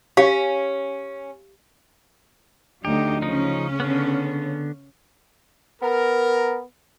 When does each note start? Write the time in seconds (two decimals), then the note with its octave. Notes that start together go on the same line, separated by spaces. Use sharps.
0.17 C#4 G4 F5
2.85 D2 F#3 D#4 G4
3.22 C#3 F3 C#4 D#4
3.80 D3 B3
5.82 B3 A#4